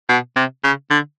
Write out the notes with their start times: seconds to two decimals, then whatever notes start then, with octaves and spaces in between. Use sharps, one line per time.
0.09 B2
0.36 C3
0.64 C#3
0.91 D3